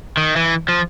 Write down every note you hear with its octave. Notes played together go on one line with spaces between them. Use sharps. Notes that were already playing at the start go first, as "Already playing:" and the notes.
D#3
E3
F3